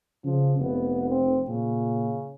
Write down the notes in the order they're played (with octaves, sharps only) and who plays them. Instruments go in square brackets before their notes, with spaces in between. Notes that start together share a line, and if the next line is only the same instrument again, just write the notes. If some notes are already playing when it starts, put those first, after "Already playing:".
[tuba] C#3 [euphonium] F3
[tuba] F1 [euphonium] B3
[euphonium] C4
[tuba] A#2 [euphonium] C#3